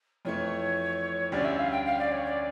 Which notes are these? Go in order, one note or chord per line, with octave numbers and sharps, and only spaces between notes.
F2 E3 A3 C#5
D2 D3 G3 C#4 D5
E5
F5
G5
F5
D5
C#5
D5